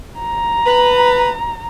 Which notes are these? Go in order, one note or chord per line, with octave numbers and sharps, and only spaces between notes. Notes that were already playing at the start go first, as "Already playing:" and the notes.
A#5
B4